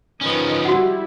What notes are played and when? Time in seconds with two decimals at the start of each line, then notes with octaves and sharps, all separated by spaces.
0.21 D#3 F3 C#4 B4 D#5
0.65 G3 E4 F#4 F#5